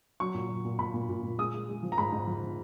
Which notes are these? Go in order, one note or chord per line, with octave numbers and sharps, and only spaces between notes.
F#3 C#6
A#2
F#3
A#2
A#2 B5
A#2
A#2
A#2
G#3 D#6
G#3
G#3
F3
A#5
G#2 B5
G#2
F3
F3